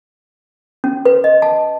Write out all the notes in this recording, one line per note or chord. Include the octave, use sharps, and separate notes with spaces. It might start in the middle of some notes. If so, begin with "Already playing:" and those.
C#4
B4
D#5
A5